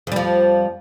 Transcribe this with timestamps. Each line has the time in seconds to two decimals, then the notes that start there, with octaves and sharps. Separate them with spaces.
0.07 F2
0.12 G3
0.16 F3